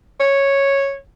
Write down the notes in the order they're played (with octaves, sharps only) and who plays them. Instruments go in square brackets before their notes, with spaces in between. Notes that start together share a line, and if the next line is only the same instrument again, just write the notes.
[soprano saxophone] C#5